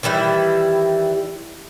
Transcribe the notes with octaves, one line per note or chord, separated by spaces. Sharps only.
D#3 E3 G3 E4